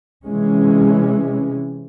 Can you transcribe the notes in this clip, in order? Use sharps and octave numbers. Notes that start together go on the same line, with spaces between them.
C3 E3 G#3 C#4